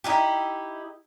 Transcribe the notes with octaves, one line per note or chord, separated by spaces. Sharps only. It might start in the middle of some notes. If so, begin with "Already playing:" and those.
D#4 E4 G4